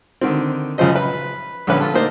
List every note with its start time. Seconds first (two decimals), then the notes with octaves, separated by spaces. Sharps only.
0.21 D3 D#3 C4
0.78 F#2 C#3 F3 C5 D#5
0.96 B4 B5
1.67 A#1 D3 C#4 B4
1.81 F3 F4 A4
1.94 A3 A#3 D4 D#4 C5